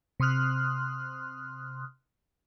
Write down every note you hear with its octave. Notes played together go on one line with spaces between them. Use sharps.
C3 C6 D#6 F6 F#6